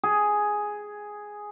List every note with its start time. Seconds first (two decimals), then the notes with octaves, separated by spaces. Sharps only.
0.04 G#4